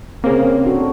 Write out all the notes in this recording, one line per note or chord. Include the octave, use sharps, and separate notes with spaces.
C#3 A#3 C4 C#5
D4 F#4 A4